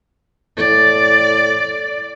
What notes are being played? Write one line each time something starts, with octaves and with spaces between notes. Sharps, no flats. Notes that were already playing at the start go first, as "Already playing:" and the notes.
A2 D5